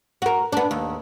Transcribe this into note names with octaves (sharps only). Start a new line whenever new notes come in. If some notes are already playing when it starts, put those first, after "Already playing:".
F#4 A#4
B3 D4
D#2